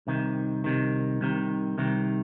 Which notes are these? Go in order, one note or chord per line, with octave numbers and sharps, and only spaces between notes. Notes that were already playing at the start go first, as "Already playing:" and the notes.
C2 C3 D#3
C2 C3 D#3
C2 C3 D#3
C2 C3 D#3